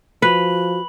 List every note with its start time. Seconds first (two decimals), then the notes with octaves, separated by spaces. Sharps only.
0.22 F3 F#4 B4 B5 F#7